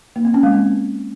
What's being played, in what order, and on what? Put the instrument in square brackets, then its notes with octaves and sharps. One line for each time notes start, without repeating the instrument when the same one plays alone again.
[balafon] A#3
C4
C#4
G#3
C4